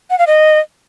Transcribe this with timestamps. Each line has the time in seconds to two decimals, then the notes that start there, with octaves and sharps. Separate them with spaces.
0.10 F#5
0.18 F5
0.27 D#5